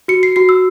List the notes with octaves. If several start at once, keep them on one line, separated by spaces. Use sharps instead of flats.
F#4 C#7
C7
F#4 C7
E6